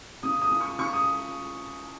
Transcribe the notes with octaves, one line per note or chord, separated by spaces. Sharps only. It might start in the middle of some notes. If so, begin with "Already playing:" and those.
C#3 D#6
D#6
C#3
C#6
C#3 C#6
D#6